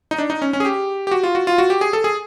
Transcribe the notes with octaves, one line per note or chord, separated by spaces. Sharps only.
D#4
D4
D#4
C#4
C#4
G#4
G4
G4
F#4
F4
F#4
F4
F#4
G4
G#4
A4
G#4